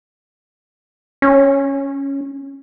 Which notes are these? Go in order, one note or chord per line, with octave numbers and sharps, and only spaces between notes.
C#4